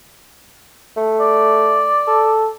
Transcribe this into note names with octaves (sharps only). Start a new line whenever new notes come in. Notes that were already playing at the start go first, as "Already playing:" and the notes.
A3
D5
A4